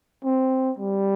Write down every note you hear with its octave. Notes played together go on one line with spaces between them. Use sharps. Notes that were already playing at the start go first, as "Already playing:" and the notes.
C4
G3